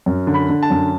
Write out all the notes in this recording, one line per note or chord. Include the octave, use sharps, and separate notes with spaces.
F#2
D3
B5
D3
A5
F#2